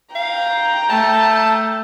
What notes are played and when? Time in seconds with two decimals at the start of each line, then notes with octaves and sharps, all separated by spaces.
0.15 F5 G5 A#5
0.90 A3 A5